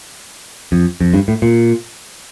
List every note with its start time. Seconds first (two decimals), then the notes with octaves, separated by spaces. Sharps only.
0.72 F2
1.00 F2
1.14 G2
1.28 A2
1.42 A#2